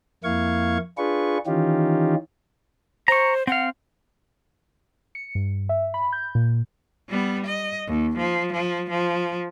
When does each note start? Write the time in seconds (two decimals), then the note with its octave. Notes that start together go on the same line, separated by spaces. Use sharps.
0.24 F2 A#3 E4 F5 C#6 G#6
0.98 D4 F4 G#4 B4 C#6
1.46 D#3 E3 C#4 D#4 F4 G4
3.08 C5 A#5 C#6
3.47 C4 F5 F#5
5.15 C#7
5.35 G2
5.69 E5
5.94 B5
6.13 G6
6.35 A#2
7.09 G3 B3
7.46 D#5
7.88 D#2
8.18 F3
8.53 F3
8.90 F3